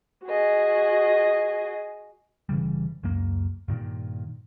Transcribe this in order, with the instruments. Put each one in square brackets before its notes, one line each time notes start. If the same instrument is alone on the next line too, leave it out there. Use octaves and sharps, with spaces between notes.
[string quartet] F#4 G#4 D#5
[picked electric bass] G1 C#3 E3 G3
C#2 F#2 A#3
G2 A#2 D#3